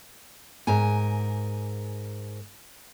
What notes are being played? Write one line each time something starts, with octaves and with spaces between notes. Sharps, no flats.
G#2 A#4 G#5